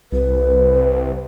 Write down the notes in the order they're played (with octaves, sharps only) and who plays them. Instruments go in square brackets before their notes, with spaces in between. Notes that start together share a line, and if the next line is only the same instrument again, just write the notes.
[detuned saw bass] C2 [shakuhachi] B4